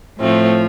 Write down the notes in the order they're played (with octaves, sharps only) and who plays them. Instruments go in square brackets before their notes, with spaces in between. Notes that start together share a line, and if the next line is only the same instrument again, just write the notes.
[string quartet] A2 F3 A3 C4